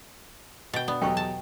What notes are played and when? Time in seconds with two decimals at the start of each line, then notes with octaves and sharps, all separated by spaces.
0.74 B2 G5 A6
0.88 B3 D4
1.02 E2 F#3 G4 A4 D#5 G5 C#6
1.17 A5